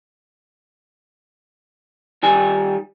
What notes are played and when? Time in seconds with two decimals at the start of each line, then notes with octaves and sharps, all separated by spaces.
2.23 D#3 G3 G#5